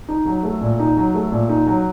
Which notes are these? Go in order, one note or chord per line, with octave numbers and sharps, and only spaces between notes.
D#4
F#3
A3
A#2
D#4
F#3
A3
A#2
D#4
F#3